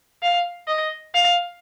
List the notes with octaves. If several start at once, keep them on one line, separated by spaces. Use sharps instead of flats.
F5
D#5
F5